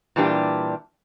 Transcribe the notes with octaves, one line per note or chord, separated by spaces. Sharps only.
A#2 E3 G3 D4 G4